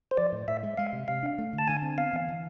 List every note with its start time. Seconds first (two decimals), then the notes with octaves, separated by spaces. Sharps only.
0.11 C5
0.17 F3 D5
0.32 A2
0.48 A2 E5
0.63 G#3
0.78 G#3 F5
0.93 C3
1.08 C3 F5
1.23 D4
1.38 A3
1.53 D3
1.59 A5
1.68 D3 G#5
1.82 C4
1.98 B3 F5
2.13 E3
2.28 E3